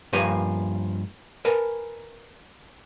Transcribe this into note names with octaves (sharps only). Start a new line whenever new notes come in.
G2 F3 A#3 B4 G#5 A#5
A#4 B4 G#5 A5